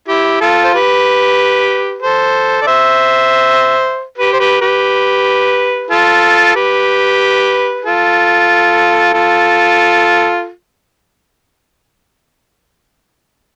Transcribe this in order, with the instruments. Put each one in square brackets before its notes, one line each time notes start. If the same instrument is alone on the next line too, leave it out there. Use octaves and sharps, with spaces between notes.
[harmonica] E4 G4
F4 A4
C5
G4 B4
A4 C5
D5
C5 E5
G4 B4
C5
G4 B4
G4 B4
F4 A4
G4 B4
F4 A4
F4 A4